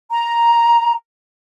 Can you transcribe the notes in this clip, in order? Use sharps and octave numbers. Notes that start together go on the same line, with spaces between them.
A#5